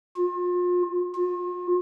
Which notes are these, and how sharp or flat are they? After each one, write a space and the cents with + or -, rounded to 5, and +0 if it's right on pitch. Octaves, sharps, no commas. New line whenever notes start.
F4 +35
F4 +40